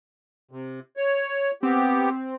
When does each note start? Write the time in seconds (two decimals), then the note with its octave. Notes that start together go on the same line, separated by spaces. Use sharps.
0.51 C3
0.97 C#5
1.63 B3 C4 G4